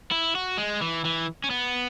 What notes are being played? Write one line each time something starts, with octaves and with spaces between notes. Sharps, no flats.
E4
F#4
G#3
E3
E3
C#4
B3